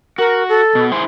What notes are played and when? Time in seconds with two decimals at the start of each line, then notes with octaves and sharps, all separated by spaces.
0.18 F#4 A#4
0.49 A4
0.75 B2
0.92 E4 G#4 C5